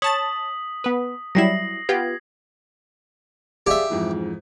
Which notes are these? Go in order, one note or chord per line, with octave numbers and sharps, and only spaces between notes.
C#5 A5 D#6 A6 B6 F#7
B3 B4
F#3 G3 E4 A#6 C7 F#7
B3 F4 G4 G#6
G4 G#4 D5 E5 F5
F2 G#2 E3